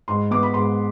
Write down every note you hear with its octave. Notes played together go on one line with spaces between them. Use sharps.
G#2 C6
B3 D6
B5
G#2 C6